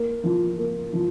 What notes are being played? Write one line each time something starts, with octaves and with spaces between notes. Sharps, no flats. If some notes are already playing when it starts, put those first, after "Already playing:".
Already playing: A#3
F3
A#3
F3